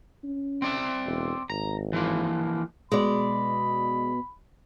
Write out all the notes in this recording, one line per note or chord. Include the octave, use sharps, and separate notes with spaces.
C#4
C4 D5 E5
E1
G#1 A#5
E3 F3 A#3
B2 G#3 D5 B5